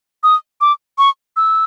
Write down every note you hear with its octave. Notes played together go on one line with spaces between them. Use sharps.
D#6
D6
C#6
E6